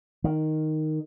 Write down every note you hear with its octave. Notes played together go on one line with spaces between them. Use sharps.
D#3